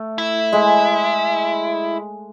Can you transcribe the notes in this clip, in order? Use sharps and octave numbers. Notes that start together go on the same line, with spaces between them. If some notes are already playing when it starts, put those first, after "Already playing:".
Already playing: A3
E4
G#3